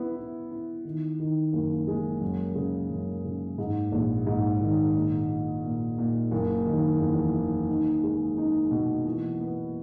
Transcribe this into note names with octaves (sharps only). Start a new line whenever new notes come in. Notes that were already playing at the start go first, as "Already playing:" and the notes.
Already playing: B3 E4
E4
E4
D#3
D#3
F#1
G#3
F#2
C#3
F#2
C#3
G#2
A#1
G#2
D#3
A#2
A#2
A#2
A#2
F#1
D#3
E2
D#3
D#4
G#3
D#4
B2
E3
B3